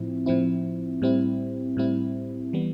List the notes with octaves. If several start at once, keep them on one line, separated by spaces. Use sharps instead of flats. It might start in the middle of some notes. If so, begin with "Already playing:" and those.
Already playing: A2 F3 C4 E4
A2 F3 C4 E4
A2 G3 C4 E4
A2 G3 C4 E4
E3 G3 B3